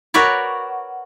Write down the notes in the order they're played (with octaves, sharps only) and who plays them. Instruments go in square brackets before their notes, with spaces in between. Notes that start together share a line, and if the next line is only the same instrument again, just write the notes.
[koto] F#4 A#4 B4 C#5 D5